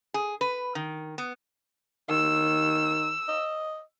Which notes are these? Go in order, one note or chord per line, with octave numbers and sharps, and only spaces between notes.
G#4
B4
D#3
B3
D#3 E6
D#5